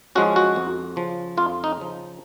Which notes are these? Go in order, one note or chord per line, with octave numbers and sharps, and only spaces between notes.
F3 G#3 C#4 F#4
F#4
F2
C#3 F3
F2 F4
D#4
C#3 F3